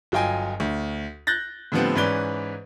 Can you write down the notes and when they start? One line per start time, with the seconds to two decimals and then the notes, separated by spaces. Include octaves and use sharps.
0.12 G1 F#3 F4 D#5 G5 G#5
0.60 D2
1.27 F#6 G6 A6 A#6
1.72 A2 D3 F3 G3 B3 C4
1.95 G#2 E3 C#4 B4 D5 G7